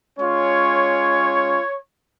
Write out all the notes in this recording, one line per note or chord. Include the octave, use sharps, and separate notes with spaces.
G#3 C#4 F4 C#5